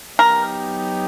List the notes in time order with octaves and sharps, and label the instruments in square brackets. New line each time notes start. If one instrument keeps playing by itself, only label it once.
[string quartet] F#3 B3 D#4 G4 [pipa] A#4